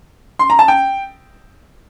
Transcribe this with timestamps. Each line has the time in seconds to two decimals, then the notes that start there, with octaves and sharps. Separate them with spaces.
0.39 C6
0.50 A#5
0.59 A5
0.68 G5